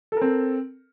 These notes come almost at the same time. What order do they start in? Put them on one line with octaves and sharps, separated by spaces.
A4 A#4 C4